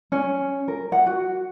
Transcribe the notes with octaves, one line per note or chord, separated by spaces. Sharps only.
C#4
A#4
F#5
F#4